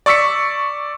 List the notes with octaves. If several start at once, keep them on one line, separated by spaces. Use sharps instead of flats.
D5 C#6 E6 B6 C#7